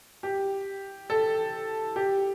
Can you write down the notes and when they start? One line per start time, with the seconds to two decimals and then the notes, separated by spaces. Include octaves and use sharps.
0.23 G4
1.10 A4
1.96 G4